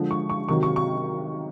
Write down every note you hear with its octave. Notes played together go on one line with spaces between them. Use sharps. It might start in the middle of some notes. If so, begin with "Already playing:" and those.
Already playing: D3 F3 G#3
C#6
C#6
C3 D#3 F#3 C#6
C#6
C#6